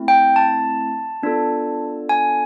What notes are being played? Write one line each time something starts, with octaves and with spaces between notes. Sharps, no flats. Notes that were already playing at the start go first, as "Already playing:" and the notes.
Already playing: A3 C4 E4
G5
A5
B3 D4 F4 A4
G#5